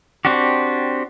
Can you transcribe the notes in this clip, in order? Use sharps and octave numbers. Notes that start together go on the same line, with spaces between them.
C4 D4 F#4 G4